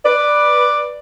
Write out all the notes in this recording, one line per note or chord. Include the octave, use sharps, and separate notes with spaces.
B4 D5